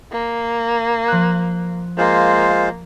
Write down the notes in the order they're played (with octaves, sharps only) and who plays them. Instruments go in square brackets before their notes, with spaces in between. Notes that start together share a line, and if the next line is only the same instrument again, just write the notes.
[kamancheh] A#3
[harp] F3 F#6
[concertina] G#3 F4 C5 [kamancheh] A#3